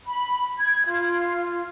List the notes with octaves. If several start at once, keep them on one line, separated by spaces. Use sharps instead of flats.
B5
G#6
F4